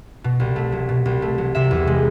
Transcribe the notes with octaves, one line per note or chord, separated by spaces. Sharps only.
B2
C2
A3
F#3
B2
C2
A3
F#3
C3 E5
E2
G#3